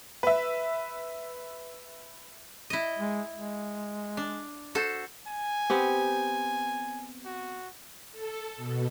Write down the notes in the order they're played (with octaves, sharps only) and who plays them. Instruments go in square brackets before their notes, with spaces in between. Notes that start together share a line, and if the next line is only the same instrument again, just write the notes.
[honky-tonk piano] B4 E5
[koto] E4 D#5
[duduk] G#3
G#3
[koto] D4
F#4 A4 C5
[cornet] G#5
[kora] B3 C4 G4
[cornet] F#4
[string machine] A4
B2